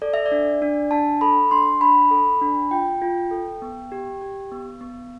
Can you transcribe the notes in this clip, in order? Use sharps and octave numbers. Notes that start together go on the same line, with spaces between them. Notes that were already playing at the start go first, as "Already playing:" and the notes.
A4 D5
E5
D5
D4
D4
D4 A5
A4 B5
D4 C6
D4 B5
A4
D4
F4 G5
F4
A4
B3
G4
G4
B3
B3